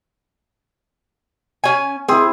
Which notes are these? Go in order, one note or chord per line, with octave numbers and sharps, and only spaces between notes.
C#4 G#5
C4 E4 G#4